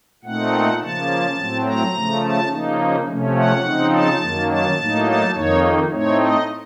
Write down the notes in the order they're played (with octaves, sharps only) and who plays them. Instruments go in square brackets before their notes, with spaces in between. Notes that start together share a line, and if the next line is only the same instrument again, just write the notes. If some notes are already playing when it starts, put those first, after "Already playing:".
[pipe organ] A#2 A3 C4 D#4 F#5
C#3 F3 A#3 A5
A2 F#3 C4
A#5
C#3 F3 A3
A5
C#3 F3 A#3 D#4
C3 F3 A3 C#4
F#5
C#3 F3 C4 D#4
A5
F#2 D#3 F#3 A#3
A5
A2 F#3 A#3 D#4
A5
F2 D#3 A#3 D#4 C#5
A2 A3 C4 D#4 C#5
D#5